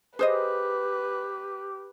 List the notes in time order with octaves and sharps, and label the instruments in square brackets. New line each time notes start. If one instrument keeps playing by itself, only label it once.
[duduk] G4 [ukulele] G#4 C5 D#5 [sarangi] B4